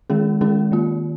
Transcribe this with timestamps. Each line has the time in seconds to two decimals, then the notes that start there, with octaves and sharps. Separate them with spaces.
0.10 D#3 G#3 C#4 G#4
0.41 D#3 G#3 C#4 G#4
0.72 D#3 A#3 F4